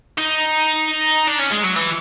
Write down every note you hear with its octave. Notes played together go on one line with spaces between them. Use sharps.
D#4
D4
C#4
G#3
F#3
E3